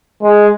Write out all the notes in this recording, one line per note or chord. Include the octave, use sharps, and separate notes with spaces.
G#3